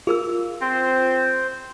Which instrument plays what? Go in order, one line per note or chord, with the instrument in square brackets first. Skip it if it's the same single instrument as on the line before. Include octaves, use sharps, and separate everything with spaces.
[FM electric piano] F4 [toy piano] G#4 A#4 E6
[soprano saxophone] C4 [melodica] C5